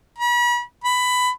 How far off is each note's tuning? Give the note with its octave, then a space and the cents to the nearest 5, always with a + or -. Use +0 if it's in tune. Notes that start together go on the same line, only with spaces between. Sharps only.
B5 -40
B5 +15